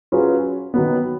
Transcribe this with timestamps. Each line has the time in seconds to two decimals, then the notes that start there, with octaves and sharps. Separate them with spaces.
0.12 F#3 C#4 F4 G#4 B4
0.74 D#3 F#3 B3